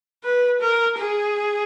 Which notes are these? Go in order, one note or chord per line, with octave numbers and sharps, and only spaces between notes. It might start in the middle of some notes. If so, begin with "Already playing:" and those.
B4
A#4
G#4